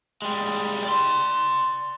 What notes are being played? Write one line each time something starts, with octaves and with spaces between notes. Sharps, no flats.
G3 G#3
D5 C6